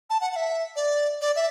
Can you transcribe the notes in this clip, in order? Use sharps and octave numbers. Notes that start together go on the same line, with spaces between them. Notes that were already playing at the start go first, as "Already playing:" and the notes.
A5
F#5
F#5
E5
D5
D5
E5